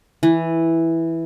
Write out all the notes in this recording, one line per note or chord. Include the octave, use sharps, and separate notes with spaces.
E3